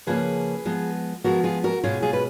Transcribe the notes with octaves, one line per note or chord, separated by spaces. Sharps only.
C#3 F3 A#3 C#4 G#4 B4
F3 G#3 B3
F3 G#3 B3 F#4 A#4
F4 G#4
F#4 A#4
B2 G#3 C#4 F4 G#4
F4 G#4
B4